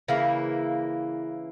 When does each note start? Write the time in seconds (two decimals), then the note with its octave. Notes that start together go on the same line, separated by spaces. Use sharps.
0.08 C#3 E3 A#3 E4